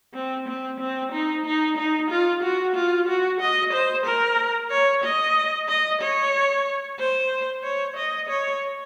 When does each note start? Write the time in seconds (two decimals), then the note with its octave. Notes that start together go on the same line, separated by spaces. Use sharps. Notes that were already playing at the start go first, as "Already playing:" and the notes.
0.14 C4
0.48 C4
0.80 C4
1.12 D#4
1.46 D#4
1.77 D#4
2.10 F4
2.43 F#4
2.75 F4
3.08 F#4
3.40 D#5
3.73 C5
4.05 A#4
4.71 C#5
5.04 D#5
5.69 D#5
6.01 C#5
6.99 C5
7.63 C#5
7.96 D#5
8.29 C#5